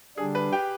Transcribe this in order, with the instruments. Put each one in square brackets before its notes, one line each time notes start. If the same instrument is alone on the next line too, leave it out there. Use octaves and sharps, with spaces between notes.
[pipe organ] D3 G3 D4 [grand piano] G#4
[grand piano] B4
G4 G5